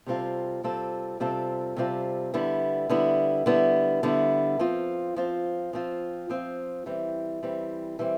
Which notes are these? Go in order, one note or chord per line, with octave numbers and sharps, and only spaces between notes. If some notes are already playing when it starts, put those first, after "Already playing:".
C3 G3 C4 F4 A4
C3 G3 C4 F4 A4
C3 G3 C4 F4 A4
C3 G3 C4 F4 A4
D3 G3 B3 E4
D3 G3 B3 E4
D3 G3 B3 E4
D3 G3 B3 E4
F3 C4 F4
F3 C4 F4
F3 C4 F4
F3 C4 F4
E3 G3 C4
E3 G3 C4
E3 G3 C4